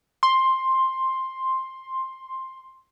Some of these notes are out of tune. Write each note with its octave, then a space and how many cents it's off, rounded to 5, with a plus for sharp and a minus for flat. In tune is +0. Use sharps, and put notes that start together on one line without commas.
C6 +10